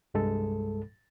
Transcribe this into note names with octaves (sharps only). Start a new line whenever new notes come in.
C2 G2 G#3 A4